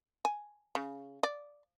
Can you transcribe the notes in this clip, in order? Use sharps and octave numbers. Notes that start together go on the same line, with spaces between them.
G#5
C#3
D5